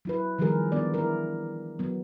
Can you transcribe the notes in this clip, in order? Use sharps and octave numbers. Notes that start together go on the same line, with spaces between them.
F#3 E4 B4
D#3 F3 G3 B3 G#4 A#4
E3 B3 D4 D5
E4 A#4
F#3 B3